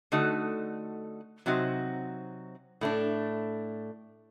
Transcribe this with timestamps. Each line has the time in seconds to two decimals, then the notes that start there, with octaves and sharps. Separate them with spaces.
0.12 D3 A3 D#4 F#4
1.46 C3 F#3 C4 D#4 F#4
2.81 A2 A3 D4